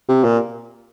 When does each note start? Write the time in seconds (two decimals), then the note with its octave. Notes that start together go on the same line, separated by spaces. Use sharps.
0.09 C3
0.24 A#2